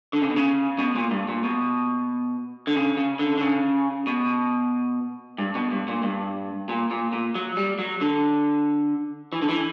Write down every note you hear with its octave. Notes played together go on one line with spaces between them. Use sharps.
D3
C#3
B2
C#3
B2
A#2
G2
A#2
B2
D3
C#3
C#3
D3
D3
C#3
B2
G2
B2
G2
A#2
G2
A#2
A#2
A#2
F#3
G3
F#3
D3
E3
D3
E3